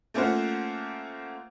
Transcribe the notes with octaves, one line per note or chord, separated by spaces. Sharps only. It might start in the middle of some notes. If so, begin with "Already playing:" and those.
A3 A#3 C#4 F4 C5 F#5